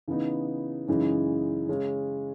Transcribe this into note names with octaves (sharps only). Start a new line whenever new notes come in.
C#3 E3 B3 D#4
F#2 C#3 E3 G#3 D#4
C#3 G#3 C#4